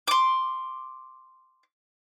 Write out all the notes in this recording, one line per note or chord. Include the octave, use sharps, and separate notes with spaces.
C6 D6